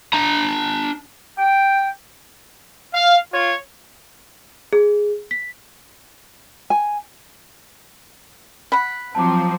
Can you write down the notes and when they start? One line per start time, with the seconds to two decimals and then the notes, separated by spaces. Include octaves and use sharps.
0.13 D4 A#5
1.39 G5
2.94 F5
3.33 F4 C#5
4.73 G#4
5.31 B6
6.70 G#5
8.72 F#5 B5
9.15 F3 F#3 C4 A5 A#5 D6